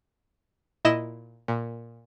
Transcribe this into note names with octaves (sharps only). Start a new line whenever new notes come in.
A#2 E4 D#5 E7
A#2